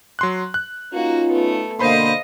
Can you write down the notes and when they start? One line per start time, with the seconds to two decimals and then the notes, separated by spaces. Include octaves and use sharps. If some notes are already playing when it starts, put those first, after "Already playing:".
0.19 F#3 C6 F#6
0.54 F#6
0.93 A#3 C#4 D#4 F4 F#4
1.29 A3 B3
1.79 B2 D3 A#3 C5 D#5 F5 B5 C6